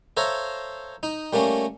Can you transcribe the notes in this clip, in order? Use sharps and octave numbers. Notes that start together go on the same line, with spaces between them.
A4 C5 C#5 E5 F5 A#5
D#4
G3 A3 A#3 C#4